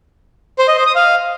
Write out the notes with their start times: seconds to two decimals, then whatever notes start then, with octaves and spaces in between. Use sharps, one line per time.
0.59 C5
0.68 D#5
0.77 C5
0.86 D#6
0.95 F5